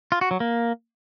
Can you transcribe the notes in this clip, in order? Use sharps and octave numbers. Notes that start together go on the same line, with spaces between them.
F4
F#4
F#3
A#3